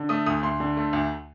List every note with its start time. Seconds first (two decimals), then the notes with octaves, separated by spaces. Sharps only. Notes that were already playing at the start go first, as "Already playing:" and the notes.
Already playing: D3
0.09 A3 D#6
0.26 D2 D#6
0.43 D2 C6
0.60 D3
0.77 A3
0.93 D2